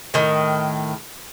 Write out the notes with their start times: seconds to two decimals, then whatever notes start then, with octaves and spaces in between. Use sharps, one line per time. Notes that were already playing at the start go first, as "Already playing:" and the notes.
0.14 A2 D#3